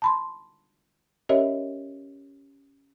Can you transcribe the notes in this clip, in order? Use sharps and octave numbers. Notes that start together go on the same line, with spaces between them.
A5 B5 C6
C#4 G4 A#4 C#5 D#5 E5